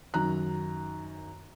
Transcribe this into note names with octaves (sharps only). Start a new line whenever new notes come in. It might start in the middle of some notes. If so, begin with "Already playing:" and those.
F#2 D#3 A#5 F#6